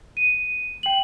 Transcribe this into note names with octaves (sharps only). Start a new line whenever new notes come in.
D#7
G5 F#7